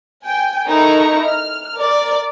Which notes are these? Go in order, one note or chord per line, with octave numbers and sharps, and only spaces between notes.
G5 G#5
D#4 E4 A4 A#4 A#5 C#6
F6
A#4 D5